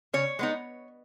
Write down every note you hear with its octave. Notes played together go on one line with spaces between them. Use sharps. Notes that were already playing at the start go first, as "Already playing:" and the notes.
C#3 C#5
G#3 B3 D#4